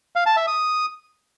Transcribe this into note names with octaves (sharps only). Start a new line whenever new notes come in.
F5
A5
E5
D#6